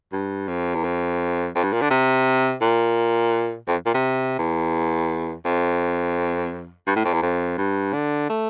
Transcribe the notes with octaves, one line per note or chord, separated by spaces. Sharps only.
G2
F2
E2
F2
F2
G2
A#2
D3
C3
A#2
F2
A#2
C3
E2
F2
G2
A2
F2
E2
F2
G2
D3
A3